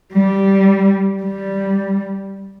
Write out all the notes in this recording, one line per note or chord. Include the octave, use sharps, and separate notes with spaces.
G3
G3